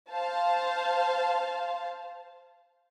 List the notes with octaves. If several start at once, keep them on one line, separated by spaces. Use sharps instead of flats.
C5 F5 A5